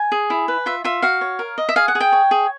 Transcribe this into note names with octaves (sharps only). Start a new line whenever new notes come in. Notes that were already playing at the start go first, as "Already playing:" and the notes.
Already playing: G#5
G#4
E4
B4
F4 E5
F4 E5
F#4 F5
C#5
A#4
D#5
E5
G#4 F5
F#5
G#4
G5
C#5
G#4